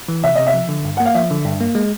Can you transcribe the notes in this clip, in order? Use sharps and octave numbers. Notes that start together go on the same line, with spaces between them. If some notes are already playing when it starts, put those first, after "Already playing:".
E3
C3 E5
C3 D#5
E5
F3
D3
G2
A#3 F#5
F5
F3 E5
D3
G2
A#3
G#3